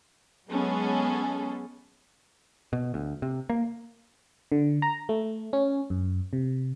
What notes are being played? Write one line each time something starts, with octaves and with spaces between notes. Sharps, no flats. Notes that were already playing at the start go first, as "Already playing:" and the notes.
F#3 G#3 B3 C#4 G#4 A4
B2
D2
C3
A#3
D3
A#5
A3
C#4
F#2
C3